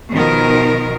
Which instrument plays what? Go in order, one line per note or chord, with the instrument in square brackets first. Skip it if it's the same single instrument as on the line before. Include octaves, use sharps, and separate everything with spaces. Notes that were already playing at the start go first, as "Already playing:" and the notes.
[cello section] B2 D#3 F3 B3 A#4